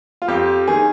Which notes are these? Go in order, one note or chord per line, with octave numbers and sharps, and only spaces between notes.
F4
F2 G4
D#3 G#4